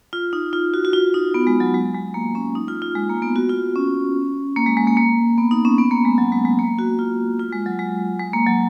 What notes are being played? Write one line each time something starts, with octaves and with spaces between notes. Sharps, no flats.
F4
D#4
F4
F#4
F#4
F4
D#4
B3
G#3
F#3
G#3
G#3
A#3
C#4
D#4
F4
F4
G#3
A#3
B3
F#4
F4
C#4
A#3
G#3
G#3
A#3
A#3
B3
D#4
C#4
B3
A#3
G#3
F#3
G#3
G#3
A#3
F#4
F4
F4
G#3
F#3
G#3
G#3
A#3
F#3